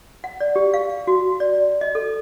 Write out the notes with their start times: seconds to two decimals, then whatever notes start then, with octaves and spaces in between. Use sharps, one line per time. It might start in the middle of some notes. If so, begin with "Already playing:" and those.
0.24 F#5
0.40 D5
0.56 G4
0.74 F5
1.07 F#4
1.40 D5
1.81 D#5
1.95 A4